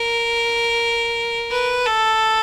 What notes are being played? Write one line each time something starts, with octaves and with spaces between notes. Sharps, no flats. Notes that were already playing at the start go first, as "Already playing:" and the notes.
Already playing: A#4
B4
A4